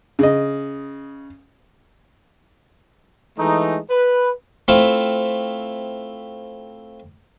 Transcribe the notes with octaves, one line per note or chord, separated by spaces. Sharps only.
C#3 D#5
E3 G#3 A3 D#4
B4
A3 C4 E4 F4